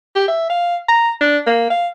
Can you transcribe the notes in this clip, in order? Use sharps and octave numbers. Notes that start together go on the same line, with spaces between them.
G4
E5
F5
A#5
D4
A#3
F5